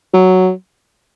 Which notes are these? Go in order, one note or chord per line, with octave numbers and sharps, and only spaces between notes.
F#3